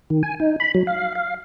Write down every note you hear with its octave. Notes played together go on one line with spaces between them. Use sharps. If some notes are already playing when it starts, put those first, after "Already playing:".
D#3
G#5
D#4
B5
F#3
F5
F5